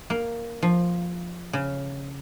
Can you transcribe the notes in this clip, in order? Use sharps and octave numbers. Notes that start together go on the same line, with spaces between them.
A#3
F3
C#3